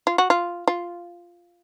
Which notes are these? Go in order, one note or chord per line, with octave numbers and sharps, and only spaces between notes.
F4
F#4
F4
F4